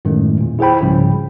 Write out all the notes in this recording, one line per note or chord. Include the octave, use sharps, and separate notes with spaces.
F#2 A2 D#3 G#3 A3
E2 A#2
E4 G#4 C5 G5 B5
C2 G#2 C#3 F3